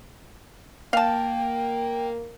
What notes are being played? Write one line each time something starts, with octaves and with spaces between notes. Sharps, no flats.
A#3 F5 G5 A5